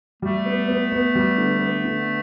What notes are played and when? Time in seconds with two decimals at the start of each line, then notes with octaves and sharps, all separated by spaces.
0.22 G3 A3
0.46 B3
0.69 B3
0.92 B3
1.15 G3
1.38 D3
1.61 B3
1.85 D3